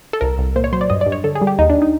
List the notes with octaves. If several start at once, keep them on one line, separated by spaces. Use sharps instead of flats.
A4
C2 A#4
C2
A#2 C5
C#5
F#3 C5
D5
G2 D#5
D5
G2
C#5
D3 A4
G#4
G3
G4
D#2 D#4
D4
D#4